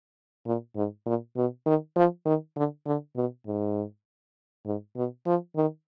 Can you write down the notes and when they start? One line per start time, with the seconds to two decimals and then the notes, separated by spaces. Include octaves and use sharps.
0.46 A#2
0.76 G#2
1.06 A#2
1.36 B2
1.66 D#3
1.96 F3
2.26 D#3
2.56 D3
2.86 D3
3.16 B2
3.46 G#2
4.66 G#2
4.96 B2
5.26 F3
5.56 D#3